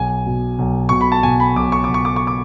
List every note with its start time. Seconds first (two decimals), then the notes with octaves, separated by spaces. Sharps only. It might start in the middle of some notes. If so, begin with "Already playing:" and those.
Already playing: B1 G#5
0.26 B2
0.59 B1
0.89 B2 C#6
1.01 B5
1.12 A5
1.23 B2 G#5
1.40 B5
1.56 B1 D6
1.72 C#6
1.84 B1 D6
1.94 C#6
2.05 D6
2.16 C#6
2.27 D6